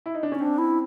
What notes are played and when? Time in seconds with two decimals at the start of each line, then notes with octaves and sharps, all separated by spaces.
0.06 E4
0.15 D#4
0.23 D4
0.32 C#4 D#4
0.40 C4 D4
0.58 E4